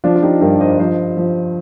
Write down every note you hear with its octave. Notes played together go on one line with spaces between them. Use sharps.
F3 D4 F4
F4
D#4 G4
G2 G4 A#4
C5 D#5
F3 C5 D#5
F3